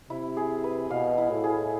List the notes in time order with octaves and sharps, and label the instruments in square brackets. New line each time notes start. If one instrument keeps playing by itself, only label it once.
[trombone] C3 [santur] E4
[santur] G#4
B4
[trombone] B2 [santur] F5
[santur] E4
[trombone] A2
[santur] G#4